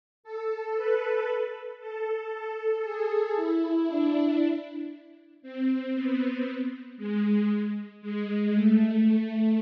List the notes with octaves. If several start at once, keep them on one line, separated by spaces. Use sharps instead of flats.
A4
B4
A4
A4
G#4
E4
D4
C4
B3
G#3
G#3
A3